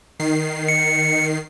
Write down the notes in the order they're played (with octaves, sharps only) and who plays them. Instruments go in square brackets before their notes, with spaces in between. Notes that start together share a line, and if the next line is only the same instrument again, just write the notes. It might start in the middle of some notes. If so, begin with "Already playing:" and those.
[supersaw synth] D#3 C7
[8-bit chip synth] C#7